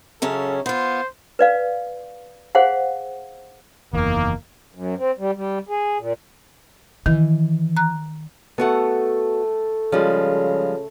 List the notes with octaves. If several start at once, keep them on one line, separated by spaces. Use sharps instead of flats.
F#2 C#3 C#4 A4
B3 F4 C5
B4 D5 F5
G#4 C5 F5 F#5
F#1 E2 D#3 A#3
F#2
C4
G3
G3
G#4
A#2
D#3 E3
A#5 F#6
A3 B3 F#4 A4 F#5
C#3 F3 G3 G#3